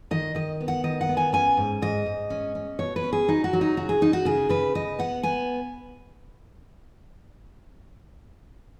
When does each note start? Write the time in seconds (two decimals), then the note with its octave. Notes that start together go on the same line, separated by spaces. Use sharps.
0.11 D#3 D#5
0.35 D#3 D#5
0.60 B3
0.68 F#5
0.84 D#3 D#5
1.01 F#5
1.09 B3
1.17 G#5
1.33 C#4 G#5
1.57 G#2
1.82 G#2 D#5
2.06 G#2
2.30 C#4
2.55 C#4
2.79 B2 C#5
2.96 B4
3.04 C#4
3.13 G#4
3.28 F#3 D#4
3.44 F#4
3.53 F#3
3.61 D#4
3.77 C#3 F#4
3.89 G#4
4.01 C#3 D#4
4.13 F#4
4.25 C#3 G#4
4.49 C#3 B4
4.75 C#3 D#5
4.99 B3 F#5
5.23 B3 G#5